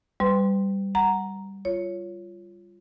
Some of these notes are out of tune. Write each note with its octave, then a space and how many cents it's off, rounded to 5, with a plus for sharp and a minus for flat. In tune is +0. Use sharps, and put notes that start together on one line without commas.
G3 +0 B4 +35 C6 +0
F#5 +0 A#5 +0
F4 -10 C#5 +0